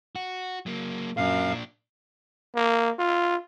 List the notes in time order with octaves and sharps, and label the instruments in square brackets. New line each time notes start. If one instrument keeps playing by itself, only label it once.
[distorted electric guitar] F#4
F#3 A#3
[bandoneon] F#2 F5 [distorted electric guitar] A#2 D4
[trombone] A#3
F4